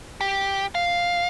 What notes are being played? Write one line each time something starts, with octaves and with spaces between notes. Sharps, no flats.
G4
F5